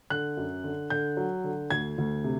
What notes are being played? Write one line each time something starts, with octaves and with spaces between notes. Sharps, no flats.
D3 F#6
F#2
D3
D3 G6
F#3
D3
D2 G#6
D2
C3